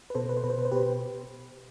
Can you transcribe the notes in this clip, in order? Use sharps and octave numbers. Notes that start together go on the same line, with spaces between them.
B4
B2 A4 C5
B4
C5
B2 B4
C5
B4
C5
B2 G4 B4